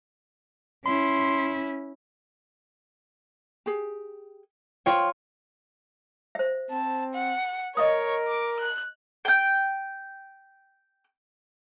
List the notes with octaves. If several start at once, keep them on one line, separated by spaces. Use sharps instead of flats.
C#4 E4 C6
G4 G#4
F4 C#5 G5
C5 E5
C4 A5
F#5
A#4 C#5 D#5 E5 D#6
D6
F#6
G5 G6